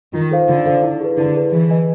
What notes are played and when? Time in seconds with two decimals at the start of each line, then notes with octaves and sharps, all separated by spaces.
0.13 D#3 F4
0.31 A4 C5 F5
0.48 D3 F4
0.66 A4 C5 F5
0.83 E4
1.01 G#4 B4
1.18 D3 E4
1.35 G#4 B4
1.52 E3 G#4
1.70 B4 D#5 G#5